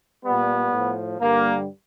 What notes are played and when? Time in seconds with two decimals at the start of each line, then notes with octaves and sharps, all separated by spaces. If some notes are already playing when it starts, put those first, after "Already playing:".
0.24 A#2 G3 B3
0.73 A2 F3
1.19 G2 D3 G3 A#3